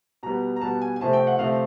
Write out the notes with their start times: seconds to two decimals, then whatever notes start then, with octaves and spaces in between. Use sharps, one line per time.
0.23 B2 G3 B3 A#5
0.56 A#5
0.61 B2 G3 B3 A5
0.82 G#5
0.96 G#5
1.01 C3 F3 A3 C4 A5
1.13 G5
1.27 F#5
1.39 C3 F3 A3 C4 F5